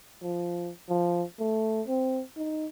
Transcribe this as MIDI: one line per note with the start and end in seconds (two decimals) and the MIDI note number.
0.22 0.71 53
0.89 1.23 53
1.40 1.82 57
1.87 2.23 60
2.37 2.67 63